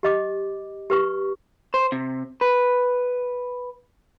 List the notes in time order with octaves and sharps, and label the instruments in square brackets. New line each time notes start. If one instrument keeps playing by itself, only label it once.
[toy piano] G4 D#5 D6
G4 B4 C#6
[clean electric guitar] C5
C3
B4